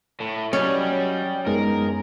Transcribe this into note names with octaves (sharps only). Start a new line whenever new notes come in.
A2
F#3 C#4 D5 D#5 G5
F#2 G#3 B3 D#4 G#4 A#4